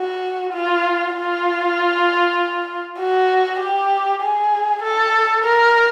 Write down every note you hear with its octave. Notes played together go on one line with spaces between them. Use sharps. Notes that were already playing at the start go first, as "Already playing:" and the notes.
Already playing: F#4
F4
F4
F#4
G4
G#4
A4
A#4